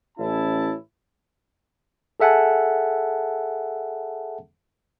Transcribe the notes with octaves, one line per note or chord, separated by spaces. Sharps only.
A1 C#4 E4 A5
G#4 A4 E5 F#5 G#5 A5